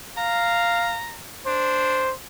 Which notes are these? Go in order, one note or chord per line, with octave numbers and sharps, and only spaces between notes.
F5 A#5
D4 C5